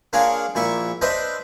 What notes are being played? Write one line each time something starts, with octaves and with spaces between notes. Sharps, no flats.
A#3 D4 F4 G#4 C#5 F#5
A#1 A#2 E4 C#6
D4 B4 C5 D#5 E5